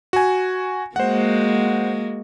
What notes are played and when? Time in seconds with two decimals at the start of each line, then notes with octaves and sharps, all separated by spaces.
0.13 F#4 G#5
0.96 G#3 A#3 F#4 C5 F#5